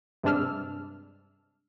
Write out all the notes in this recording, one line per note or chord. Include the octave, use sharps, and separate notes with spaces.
G2 C3 G#3 D4 E6 F6